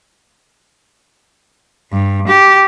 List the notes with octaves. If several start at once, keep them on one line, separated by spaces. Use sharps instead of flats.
G2
G4